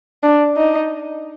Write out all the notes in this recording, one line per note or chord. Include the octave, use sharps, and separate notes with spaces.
D4
D#4